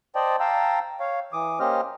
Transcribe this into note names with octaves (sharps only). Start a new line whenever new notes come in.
C5 D5 D#5 G5 A5
F5 G5 A5 A#5 E6
C#5 F5
E3 D6 D#6
A#3 C#4 G4 C5 D#5 F6